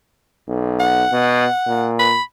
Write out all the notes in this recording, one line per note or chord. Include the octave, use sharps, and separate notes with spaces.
B1
F#5
B2
A#2
B5